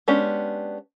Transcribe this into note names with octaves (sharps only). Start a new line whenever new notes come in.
G#3 B3 C#4 D4 G4